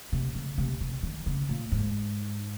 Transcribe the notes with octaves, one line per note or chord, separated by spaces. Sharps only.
C3
C#3
C3
C3
D#3
C#3
A#2
G#2